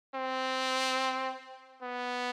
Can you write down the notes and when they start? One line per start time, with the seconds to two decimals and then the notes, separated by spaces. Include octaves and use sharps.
0.15 C4
1.82 B3